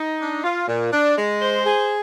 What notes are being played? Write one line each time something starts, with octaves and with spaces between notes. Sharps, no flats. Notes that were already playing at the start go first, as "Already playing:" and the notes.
Already playing: D#4
D4
F4
A#2
D4
G#3
C5
G#4